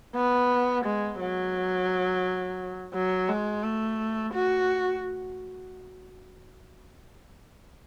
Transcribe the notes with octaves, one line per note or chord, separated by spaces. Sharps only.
B3
G#3
F#3
F#3
G#3
A3
F#4